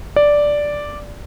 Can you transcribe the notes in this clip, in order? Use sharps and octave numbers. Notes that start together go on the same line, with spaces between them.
D5